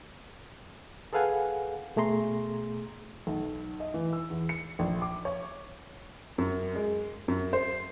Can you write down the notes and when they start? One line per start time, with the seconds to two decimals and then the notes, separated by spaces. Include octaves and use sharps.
1.13 G#4 A4 B4 F5 F#5 G#5
1.96 B2 A3 G#4 A#5 C6
3.27 B1
3.80 D#5
3.94 E3
4.13 E6
4.30 E2
4.49 C#7
4.79 A#1
5.02 D6
5.25 C#5
6.38 F#2
6.75 G#3
7.28 F#2
7.53 C5